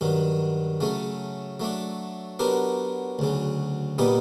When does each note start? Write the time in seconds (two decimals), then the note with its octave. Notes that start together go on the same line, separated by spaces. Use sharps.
0.01 G2 D#3 F#3
0.80 C#3 F#3 A3 C#4
1.60 F#3 A3 D4
2.39 F#3 B3 D4 G4 A#4
3.19 D2 C#3 F#3
3.98 A#2 G3 B3 D#4 G4